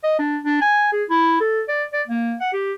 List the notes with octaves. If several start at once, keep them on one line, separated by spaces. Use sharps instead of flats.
D#5
D4
D4
G#5
G#4
E4
A4
D5
D5
A#3
F#5
G4